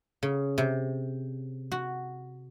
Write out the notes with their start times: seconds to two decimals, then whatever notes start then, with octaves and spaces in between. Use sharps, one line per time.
0.23 C#3
0.58 C3
1.72 F#4